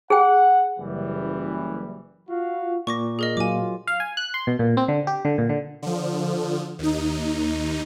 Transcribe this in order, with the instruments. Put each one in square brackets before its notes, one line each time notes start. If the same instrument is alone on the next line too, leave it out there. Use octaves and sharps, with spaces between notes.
[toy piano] G#4 G5 [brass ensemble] F#5
[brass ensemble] F#1 E3 G3
F4 F#4 F5
[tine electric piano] A#2 [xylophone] C#6 D6 A#6
[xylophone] G#4 A#4 D#5
[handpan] F#3 F4 [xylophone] G#5 D6
[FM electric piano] F5
G#5
F#6
C6
B2
A#2
C4
D3
G4
D3
A#2
D3
[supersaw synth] D3 F3
D#2 D#4